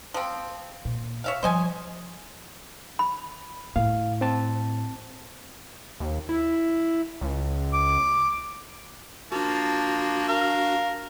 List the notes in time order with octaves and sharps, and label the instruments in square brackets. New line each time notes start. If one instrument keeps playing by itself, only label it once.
[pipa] F3 C4
[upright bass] A#2
[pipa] C#5 E5 F5
[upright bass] F3 G3 [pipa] C5 D#5 G#5
[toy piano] B5
[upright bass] A2 [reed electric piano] F5
[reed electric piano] C4 A5
[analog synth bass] D#2
E4
C#2
[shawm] D6
[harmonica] F3 A#3 A5 [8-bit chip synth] D4 F#4
[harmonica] A#4 F5